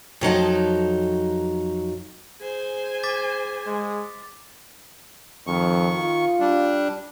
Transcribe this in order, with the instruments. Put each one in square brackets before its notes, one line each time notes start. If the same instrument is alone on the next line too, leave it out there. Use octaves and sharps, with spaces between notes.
[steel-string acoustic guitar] F2 F#3 D#4 A5
[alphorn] G#4 [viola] C5 G#5
[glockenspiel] D6 A6 B6
[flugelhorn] G#3
[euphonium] F2 [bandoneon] D#3 C#6
[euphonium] F4
[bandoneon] G3 D4